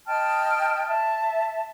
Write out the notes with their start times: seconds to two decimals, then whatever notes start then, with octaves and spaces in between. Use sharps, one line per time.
0.06 D#5 G5 A5 F6
0.87 E5 A5